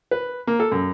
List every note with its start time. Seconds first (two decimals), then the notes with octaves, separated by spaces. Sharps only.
0.11 B4
0.47 A#3
0.60 A4
0.72 F#2